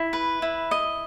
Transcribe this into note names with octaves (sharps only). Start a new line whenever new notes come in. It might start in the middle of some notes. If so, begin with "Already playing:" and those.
Already playing: E4
B4
E4
D#5